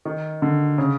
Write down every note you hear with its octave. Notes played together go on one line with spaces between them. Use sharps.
D#3
D3
C#3